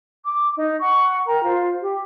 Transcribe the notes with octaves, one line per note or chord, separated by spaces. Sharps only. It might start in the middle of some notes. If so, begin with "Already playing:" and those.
D6
D#4
F#5 C#6
A#4 G5 A#5
F4 C5
G4